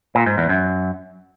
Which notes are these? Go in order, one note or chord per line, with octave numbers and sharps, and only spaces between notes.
A#2
G#2
E2
F#2